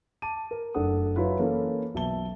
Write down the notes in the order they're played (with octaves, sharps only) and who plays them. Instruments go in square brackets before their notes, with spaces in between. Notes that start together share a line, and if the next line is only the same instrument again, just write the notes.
[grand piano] A5 D6 D#7
A#4
F#1 A3 D4 A4 F#5 D#6
F#3 E4 F4 B4
E3 A#3 C#4 E4 A4
B1 B2 E5 A5 G7